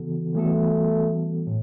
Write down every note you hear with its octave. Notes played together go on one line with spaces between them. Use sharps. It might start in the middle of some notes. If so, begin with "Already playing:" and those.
Already playing: C#3 E3 B3 F#4 A4
E3 G3 A3 B3 F#4 A4
A2